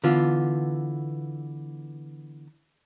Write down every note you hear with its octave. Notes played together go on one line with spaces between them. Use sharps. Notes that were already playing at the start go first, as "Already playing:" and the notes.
D3 E3 B3 F4